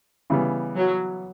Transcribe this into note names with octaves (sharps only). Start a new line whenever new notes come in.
C#3 E3 G3 B3
F#3